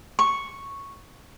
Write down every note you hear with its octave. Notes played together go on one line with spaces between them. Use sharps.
C#6